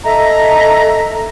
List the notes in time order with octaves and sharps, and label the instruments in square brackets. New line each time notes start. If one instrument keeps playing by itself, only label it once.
[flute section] A4 D#5 E5 A#5